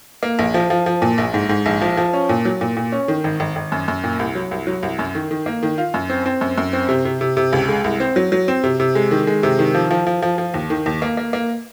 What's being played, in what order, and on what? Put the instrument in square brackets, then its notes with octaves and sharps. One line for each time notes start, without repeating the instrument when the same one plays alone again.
[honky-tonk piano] A#3
A#1
F3
F3
F3
A#2
A#1
G#2
G#2
A#1
F3
F3
C#4
A#2
F#3
A#2
A#2
C#4
D#3
G#1
G#1
G#1
F#2
F#2
A#2
C2
F#3
C2
F#3
C2
F#2
D#3
D#3
A#3
D#3
F4
F#2
C4
C4
F#2
F#2
C4
C3
C3
C3
C3
C#2
G#3
C2
C4
F#3
F#3
C4
C3
C3
G#3
D#3
G#3
C3
D#3
F3
F3
F3
F3
F3
D#2
D#3
D#2
A#3
A#3
A#3